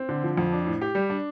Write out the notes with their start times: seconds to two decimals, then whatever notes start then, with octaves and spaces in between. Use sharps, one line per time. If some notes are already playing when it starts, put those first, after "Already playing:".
Already playing: C4
0.09 D3
0.23 F3
0.38 F2
0.52 D4
0.66 A2
0.81 G4
0.95 G3
1.10 D4